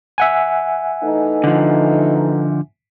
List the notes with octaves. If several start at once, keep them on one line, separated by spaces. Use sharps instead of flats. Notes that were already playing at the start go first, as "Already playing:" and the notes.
E5 F#5 G#5
E3 A3 D#4
D3 F3